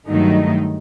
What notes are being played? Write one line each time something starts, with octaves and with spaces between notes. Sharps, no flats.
G2 D#3 F#3 A3 D#4